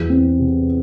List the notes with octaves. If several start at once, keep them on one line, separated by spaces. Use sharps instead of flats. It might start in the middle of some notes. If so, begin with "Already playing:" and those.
Already playing: E2
C4
C3